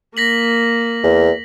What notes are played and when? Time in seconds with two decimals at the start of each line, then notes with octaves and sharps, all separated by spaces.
0.17 A#3 A#6 B6 F#7
1.04 E2